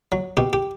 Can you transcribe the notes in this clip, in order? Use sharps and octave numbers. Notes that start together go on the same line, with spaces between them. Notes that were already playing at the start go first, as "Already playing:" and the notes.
F#3
B2 G4
G4